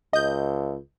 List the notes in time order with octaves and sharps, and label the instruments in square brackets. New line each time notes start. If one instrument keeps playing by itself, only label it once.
[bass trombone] C#2 [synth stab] D#5 G6